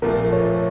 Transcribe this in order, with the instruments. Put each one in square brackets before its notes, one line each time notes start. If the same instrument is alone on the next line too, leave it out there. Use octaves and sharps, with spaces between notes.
[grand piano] A#1 A#2 F3 A3 [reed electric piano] A#4
[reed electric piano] C#5